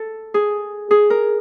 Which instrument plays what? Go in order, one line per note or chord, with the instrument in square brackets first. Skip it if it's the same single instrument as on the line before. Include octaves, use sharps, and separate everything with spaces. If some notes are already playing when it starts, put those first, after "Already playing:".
Already playing: [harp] A4
G#4
G#4
A#4